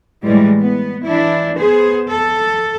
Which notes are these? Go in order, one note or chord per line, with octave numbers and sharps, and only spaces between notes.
A2 E3 G3 G#3
B3
E3 D4 E4
B3 G#4 C5
A4